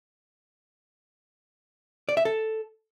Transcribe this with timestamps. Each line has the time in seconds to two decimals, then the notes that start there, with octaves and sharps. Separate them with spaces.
2.09 D5
2.17 E5
2.25 A4